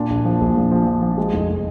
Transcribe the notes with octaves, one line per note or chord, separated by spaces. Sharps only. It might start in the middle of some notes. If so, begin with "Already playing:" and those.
Already playing: A#2 D4
A#1
F3
A#1
A#2
F3
F3
F3
G#3
F1